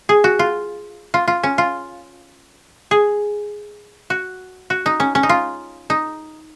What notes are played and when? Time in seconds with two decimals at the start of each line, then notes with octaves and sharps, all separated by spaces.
0.09 G#4
0.24 F#4
0.39 F4
1.14 F4
1.28 F4
1.43 C#4
1.58 F4
2.91 G#4
4.10 F#4
4.70 F#4
4.86 D#4
5.00 C#4
5.15 C#4
5.23 D#4
5.29 F4
5.90 D#4